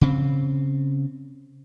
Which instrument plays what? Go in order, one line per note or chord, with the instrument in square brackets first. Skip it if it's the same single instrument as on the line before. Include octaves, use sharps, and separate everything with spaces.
[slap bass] C#3 C4